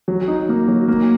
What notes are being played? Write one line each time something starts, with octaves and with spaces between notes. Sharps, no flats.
F#3
D#4
A#3
F#3
A#3